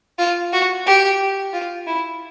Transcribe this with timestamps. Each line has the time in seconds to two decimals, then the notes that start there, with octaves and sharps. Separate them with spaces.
0.18 F4
0.53 F#4
0.86 G4
1.53 F4
1.87 E4